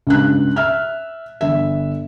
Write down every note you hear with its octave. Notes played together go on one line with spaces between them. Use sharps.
C#2 G2 F#6
E5 F6
G1 E5